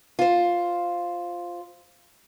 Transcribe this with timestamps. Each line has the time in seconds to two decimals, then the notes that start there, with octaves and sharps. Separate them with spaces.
0.19 F4 C5